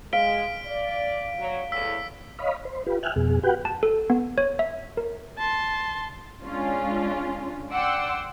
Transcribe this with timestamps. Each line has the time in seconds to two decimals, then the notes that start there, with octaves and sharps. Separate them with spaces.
0.13 G#3 F5 B6 D7 G7
0.66 D5
1.39 F#3
1.72 E2 A2 E6 B6
2.39 C#5 D#5 F5 B5
2.65 C5
2.86 F4 G4 B4
3.03 E5 G5 G#5 F6 F#6
3.16 F2 B2 G#4
3.43 F#4 G4 B4 F#5 G5
3.65 A5
3.83 A4
4.10 B3
4.38 C#5
4.59 E5
4.97 A#4
5.38 A5 C6
6.43 G#3 C#4 D4 F4
7.71 D5 F#5 G5 C6 D6 E6